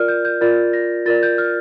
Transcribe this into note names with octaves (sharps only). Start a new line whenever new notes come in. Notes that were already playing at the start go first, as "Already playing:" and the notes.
Already playing: F4 A#4 D5 F6
G6
G6
F4 A#4 D5 A6
A#6
F4 A#4 D5 A6
G6
F6